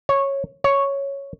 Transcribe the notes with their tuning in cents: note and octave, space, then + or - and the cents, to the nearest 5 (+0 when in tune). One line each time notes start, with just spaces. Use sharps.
C#5 -10
C#5 +0